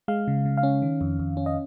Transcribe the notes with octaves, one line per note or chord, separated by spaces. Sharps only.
G#3 F5
C#3
C#3
F5
C#4
D#3
F2
F2
C#4
D#5